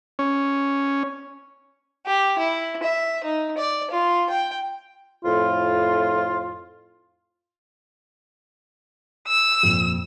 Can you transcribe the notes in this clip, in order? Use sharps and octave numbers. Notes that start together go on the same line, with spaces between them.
C#4
G4
E4
E5
D#4
D5
F4
G5
F2 A2 F4
E6
F2 A#2